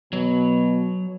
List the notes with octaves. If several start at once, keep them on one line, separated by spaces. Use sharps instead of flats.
B2 F#3